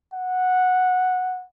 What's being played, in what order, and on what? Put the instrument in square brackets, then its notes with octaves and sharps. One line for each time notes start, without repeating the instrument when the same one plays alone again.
[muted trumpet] F#5